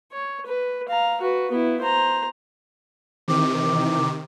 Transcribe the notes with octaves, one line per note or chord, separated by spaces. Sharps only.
C#5
B4
F5 A#5
F#4 B4
B3 E4
C5 A#5
C3 D#3 E3 C4 D6